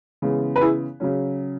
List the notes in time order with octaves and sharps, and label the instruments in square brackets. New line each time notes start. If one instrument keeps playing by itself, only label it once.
[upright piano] C#3 E3 G#3 B3
B4
E4 G#4
C#3 F#3 C#4